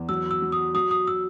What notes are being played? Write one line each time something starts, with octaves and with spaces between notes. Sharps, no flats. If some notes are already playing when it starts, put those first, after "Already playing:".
Already playing: E2
F#3 E6
E6
F#3
D#6
F#3 D#6
D#6
E6